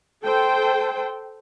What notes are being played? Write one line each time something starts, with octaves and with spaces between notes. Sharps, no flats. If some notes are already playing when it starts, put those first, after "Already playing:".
A4 C5 G5